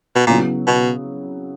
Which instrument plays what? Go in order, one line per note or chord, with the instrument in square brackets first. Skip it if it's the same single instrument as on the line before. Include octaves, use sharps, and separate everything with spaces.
[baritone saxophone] B2
[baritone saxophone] A#2 [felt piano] C#3 F#3 B3 E4
[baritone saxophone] B2